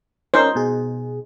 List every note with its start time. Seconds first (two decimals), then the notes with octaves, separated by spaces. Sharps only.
0.34 C#4 D#4 A#4 C5
0.55 B2 G#4